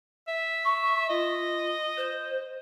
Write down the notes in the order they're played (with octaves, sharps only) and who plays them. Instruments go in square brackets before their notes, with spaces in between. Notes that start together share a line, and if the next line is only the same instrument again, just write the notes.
[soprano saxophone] E5
[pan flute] C#6
[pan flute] F4 [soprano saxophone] D#5
[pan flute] C5